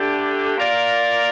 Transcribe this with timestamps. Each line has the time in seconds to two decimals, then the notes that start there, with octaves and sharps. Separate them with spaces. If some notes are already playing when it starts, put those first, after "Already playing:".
Already playing: D3 A3 D4 G4
0.56 A#3 F4 A#4 D5 F5